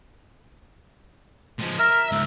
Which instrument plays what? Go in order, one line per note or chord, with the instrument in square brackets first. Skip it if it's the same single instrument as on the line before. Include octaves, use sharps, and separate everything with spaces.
[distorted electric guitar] F3 G#3
[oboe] A#4 [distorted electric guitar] E5
[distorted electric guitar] C#2 G#2 [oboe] E5